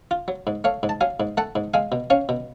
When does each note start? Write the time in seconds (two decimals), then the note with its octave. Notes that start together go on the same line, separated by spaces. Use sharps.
0.11 F4
0.28 F#3
0.47 G#2
0.64 A3 C#5 F5
0.83 G#2
0.89 A5
1.01 F#3 F5 G#5
1.20 G#2
1.37 A3 F#5 A5
1.56 G#2
1.74 G#3 F5 G#5
1.92 B2
2.10 C#4 C#5 F5
2.29 B2